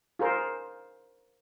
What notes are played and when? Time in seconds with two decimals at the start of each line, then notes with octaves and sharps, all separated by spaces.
0.19 F4 G#4 A#4 C5